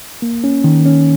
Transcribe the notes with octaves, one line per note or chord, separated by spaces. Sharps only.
A#3
C#4
D#3
C#4